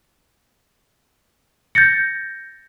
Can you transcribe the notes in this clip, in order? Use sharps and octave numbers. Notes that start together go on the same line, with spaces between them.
G6 A6 A#6 C#7